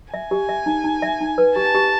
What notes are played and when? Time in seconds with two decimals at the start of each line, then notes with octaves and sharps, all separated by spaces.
0.13 E5 G#5
0.31 G4
0.49 E5
0.66 D#4
0.84 D#4
1.02 E5
1.21 D#4
1.38 B4
1.56 G4 A5
1.75 G4